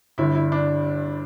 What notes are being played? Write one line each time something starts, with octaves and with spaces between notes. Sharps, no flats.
G1 G2 D3 E4
E4
D4